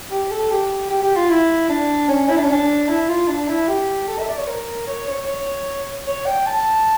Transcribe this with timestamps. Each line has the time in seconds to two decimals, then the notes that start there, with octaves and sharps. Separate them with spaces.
0.11 G4
0.31 A4
0.51 G4
0.90 G4
1.03 G4
1.16 F4
1.29 E4
1.69 D4
2.09 C#4
2.29 E4
2.37 D4
2.44 C#4
2.52 D4
2.88 E4
3.08 F4
3.28 D4
3.48 E4
3.68 G4
4.08 A4
4.19 E5
4.29 D5
4.38 C#5
4.47 A#4
4.87 C#5
5.07 C#5
5.27 C#5
6.07 C#5
6.26 G5
6.46 A5